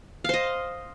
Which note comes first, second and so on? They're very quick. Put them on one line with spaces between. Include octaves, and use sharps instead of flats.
F5 C5 D#5